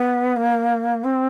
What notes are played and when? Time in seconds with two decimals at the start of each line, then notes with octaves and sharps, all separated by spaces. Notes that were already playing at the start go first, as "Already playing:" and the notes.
Already playing: B3
0.36 A#3
1.04 C4